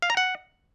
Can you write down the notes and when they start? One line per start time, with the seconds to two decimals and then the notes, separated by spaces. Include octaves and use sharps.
0.02 F5
0.10 A#5
0.17 F#5